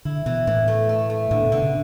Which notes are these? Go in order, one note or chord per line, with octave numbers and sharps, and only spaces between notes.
D3 E4
B2 E3
A2 E3
A3
A3
A3
A2 D3
B2
B2 D3
C#3